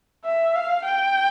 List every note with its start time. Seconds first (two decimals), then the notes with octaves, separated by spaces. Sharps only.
0.25 E5
0.55 F5
0.85 G5